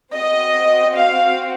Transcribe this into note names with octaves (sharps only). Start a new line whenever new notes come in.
C4 F#4 D#5
F5